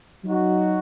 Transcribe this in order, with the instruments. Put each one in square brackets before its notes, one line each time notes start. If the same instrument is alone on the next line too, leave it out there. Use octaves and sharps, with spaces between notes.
[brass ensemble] F#3 D#4 F#4